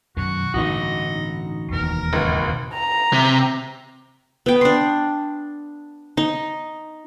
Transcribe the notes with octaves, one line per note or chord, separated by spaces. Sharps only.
F#2 B2 D#3 F#4
A1 G2 D3 D#4 F#4 D#5
E1 D#2 E3 A#4
G#1 C#2
A#5
C3
B3 G5
D4 C6
D#4